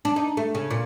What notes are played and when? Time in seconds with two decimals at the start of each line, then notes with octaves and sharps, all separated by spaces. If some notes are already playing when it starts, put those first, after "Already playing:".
0.05 D4
0.16 D#4
0.37 A3
0.55 C#3
0.71 A#2